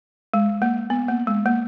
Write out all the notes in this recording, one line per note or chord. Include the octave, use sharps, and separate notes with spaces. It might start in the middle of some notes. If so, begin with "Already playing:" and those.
G#3
A#3
B3
A#3
G#3
A#3